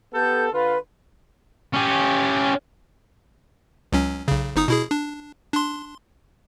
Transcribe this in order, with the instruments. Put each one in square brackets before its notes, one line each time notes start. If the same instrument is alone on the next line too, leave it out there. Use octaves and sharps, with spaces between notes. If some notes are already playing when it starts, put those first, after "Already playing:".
[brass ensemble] B3 G4 A4 [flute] G6
[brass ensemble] D3 F4 [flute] B4
[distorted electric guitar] C#4 G4
[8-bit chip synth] C#2 F#3 C#4
B1 C#3
G1 D#4 D#6
B2 E4 G#4
D4
D4 C6